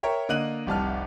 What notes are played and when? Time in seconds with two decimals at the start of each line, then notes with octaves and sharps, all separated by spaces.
0.03 A#4 C#5 E5 G5
0.29 D3 A#3 D#5 F#6 D#7 F#7
0.67 F1 C2 A5 F6